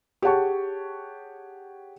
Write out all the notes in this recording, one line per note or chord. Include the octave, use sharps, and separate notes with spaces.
G4 G#4 C#5 F#5 A5 C#6